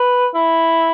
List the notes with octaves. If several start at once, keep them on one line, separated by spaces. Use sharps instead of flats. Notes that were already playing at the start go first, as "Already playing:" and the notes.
Already playing: B4
E4